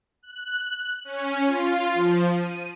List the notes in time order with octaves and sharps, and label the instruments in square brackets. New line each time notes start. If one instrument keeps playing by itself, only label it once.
[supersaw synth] F#6
C#4
F4
F3
D#7